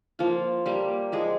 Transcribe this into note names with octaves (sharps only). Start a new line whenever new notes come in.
F3 A#3 F4
G3 A#3 G4
F3 G#3 G#4